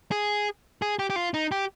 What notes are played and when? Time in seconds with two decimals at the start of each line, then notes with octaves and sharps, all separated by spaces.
0.11 G#4
0.82 G#4
0.99 G4
1.10 G4
1.16 F4
1.34 D#4
1.52 G4